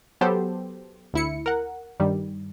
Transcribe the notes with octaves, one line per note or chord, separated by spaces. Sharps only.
F#3 B3 G4 A4 C5
D2 E4 C#7
A#4 F#5
G2 D#3 G3